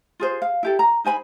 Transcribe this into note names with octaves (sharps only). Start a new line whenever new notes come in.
F4 G#4 C5
F5
E4 G4 A4
A#5
D#4 C5 G#5 B5